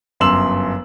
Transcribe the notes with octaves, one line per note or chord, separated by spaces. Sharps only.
G1 F#2 C6 E6 E7 F#7